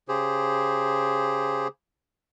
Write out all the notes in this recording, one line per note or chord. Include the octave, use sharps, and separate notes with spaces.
C#3 G4 G#4 C5